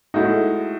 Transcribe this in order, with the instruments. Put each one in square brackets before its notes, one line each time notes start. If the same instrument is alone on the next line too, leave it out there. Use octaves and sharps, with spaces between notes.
[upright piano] A2 G#3 D#4 F#4